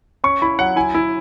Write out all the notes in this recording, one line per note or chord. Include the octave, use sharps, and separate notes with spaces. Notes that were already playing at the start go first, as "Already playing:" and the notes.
C#4 C#6
E4 B5
F#3 F#5
E4 G#5
E4